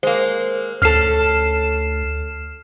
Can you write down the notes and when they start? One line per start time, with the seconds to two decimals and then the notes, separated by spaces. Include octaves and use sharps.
0.03 G#3 A#3 C5
0.82 D2 C#4 A4 F6 C7 E7